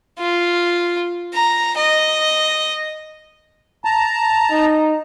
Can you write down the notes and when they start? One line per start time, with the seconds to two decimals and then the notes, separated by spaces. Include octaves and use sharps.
0.19 F4
1.34 A#5
1.77 D#5
3.85 A5 A#5
4.51 D#4